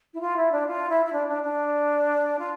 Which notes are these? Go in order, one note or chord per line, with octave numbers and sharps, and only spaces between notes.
E4
F4
E4
D4
F4
E4
E4
D4
D4
D4
F4